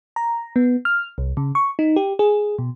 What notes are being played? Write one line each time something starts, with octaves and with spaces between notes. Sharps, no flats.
A#5
B3
F6
C2
C#3
C#6
D#4
G4
G#4
B2